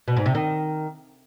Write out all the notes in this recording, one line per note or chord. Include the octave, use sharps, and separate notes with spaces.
B2
G#2
C3
D#3